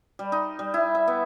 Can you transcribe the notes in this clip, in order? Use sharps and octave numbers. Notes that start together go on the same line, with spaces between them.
G3
D#4
G3
E4
E5
B3